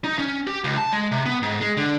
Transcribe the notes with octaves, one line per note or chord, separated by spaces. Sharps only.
D#4
C#4
G4
C#2
A5
G#3
C3
B3
G#2
G#3
D3